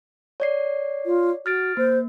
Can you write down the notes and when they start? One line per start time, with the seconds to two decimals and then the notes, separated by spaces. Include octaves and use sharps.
0.40 C#5 D5 C7
1.06 F4
1.46 F#4 F6 A6 D7
1.77 A#3 C5